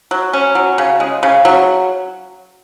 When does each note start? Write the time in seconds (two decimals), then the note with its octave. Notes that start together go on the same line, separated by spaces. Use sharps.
0.11 F#3
0.33 C#4
0.55 F#3
0.78 C#3
1.00 G#3
1.23 C#3
1.45 F#3